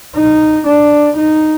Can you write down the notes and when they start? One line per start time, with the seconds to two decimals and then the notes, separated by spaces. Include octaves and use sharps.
0.15 D#4
0.66 D4
1.16 D#4